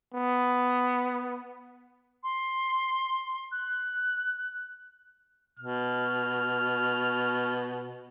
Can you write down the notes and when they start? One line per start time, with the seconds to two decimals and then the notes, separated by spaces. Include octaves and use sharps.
0.14 B3
2.23 C6
3.51 F#6
5.59 B2 F6